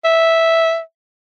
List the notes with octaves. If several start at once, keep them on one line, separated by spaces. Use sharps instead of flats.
E5